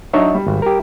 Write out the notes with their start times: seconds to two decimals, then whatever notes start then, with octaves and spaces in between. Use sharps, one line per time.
0.13 F#3 D4 D#4 C#5 E5
0.34 G3
0.47 G#1
0.62 G4 A#4